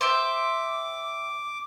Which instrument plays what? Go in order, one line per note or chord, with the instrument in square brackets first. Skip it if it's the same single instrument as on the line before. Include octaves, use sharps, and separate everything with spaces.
[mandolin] C5 E5 G5 [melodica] D6